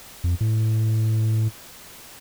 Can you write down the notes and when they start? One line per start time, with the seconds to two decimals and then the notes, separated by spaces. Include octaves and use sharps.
0.24 F2
0.41 A2